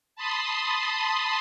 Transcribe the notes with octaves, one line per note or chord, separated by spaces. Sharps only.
A5 B5 C6 D#6